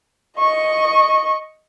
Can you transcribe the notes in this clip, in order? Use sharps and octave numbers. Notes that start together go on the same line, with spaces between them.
D#5 C#6